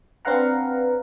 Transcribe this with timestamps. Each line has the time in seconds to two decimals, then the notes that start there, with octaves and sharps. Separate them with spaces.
0.25 C4 D4 B4 F5 F#5 A#5